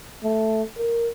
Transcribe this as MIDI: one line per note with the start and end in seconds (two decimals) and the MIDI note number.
0.23 0.62 57
0.78 1.09 70